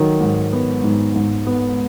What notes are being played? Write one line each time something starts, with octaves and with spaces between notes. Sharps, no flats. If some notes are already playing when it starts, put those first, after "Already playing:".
Already playing: D#3 F#3
G#2
B3
G#2
G#2
B3